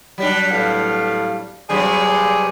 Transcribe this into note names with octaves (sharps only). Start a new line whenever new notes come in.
F#3 G3 D4
A2 B3 F5
G2 C3 F#3 G#4 C5 D5